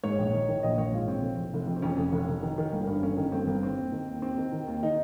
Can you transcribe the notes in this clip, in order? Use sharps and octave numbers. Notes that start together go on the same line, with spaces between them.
G#2 C#5
A#1
D#3
D#3
A#1 D#5
A#1 C#5
G#2 F4
A#1 C4
F1
F2
F1
F2
C4
F2 C#4
F1
F1
F1
D#3
D#3
G1
G2
G1 C#4
D#3
G1 C4
G1
D#3 C4
D#2
D#3
D#2
D#2 C4
D#3
D#3
D#2
D#3 D#4